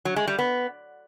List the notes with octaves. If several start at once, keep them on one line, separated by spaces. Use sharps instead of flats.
F#3
G#3
G3
B3